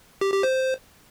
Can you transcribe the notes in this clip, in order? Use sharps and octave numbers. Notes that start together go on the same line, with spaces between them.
G4
G4
C5